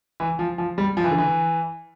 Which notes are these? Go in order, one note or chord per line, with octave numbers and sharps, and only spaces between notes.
E3
F3
F3
G3
F3
E3
D3
E3